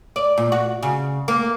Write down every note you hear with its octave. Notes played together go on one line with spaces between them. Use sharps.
D5
A#2
F#4
C#3
A#3